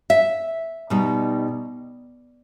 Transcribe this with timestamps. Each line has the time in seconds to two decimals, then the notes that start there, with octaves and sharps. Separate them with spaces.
0.10 E5
0.90 B2 G3 D#4